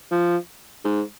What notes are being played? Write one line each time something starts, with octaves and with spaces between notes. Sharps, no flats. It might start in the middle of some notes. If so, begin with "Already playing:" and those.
F3
G#2